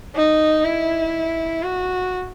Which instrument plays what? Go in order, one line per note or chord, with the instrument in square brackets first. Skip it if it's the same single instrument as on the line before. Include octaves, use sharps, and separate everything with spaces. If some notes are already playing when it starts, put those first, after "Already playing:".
[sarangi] D#4
E4
F#4